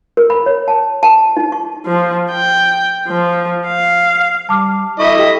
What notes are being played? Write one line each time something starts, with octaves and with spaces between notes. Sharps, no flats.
A#4
B5
C#5
A5
A5
D#4
C#6
F3
G5
F3
F5
G3 A5 D6 F6
E4 A4 D#5 E5 C#6
G4 G5